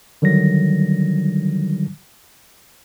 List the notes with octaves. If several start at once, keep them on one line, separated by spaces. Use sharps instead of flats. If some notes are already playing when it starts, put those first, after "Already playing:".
D3 D#3 F#3 G3 A#6